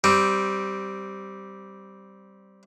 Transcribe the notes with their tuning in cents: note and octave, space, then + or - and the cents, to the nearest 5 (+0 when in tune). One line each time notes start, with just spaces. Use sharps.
G3 -10 C4 +0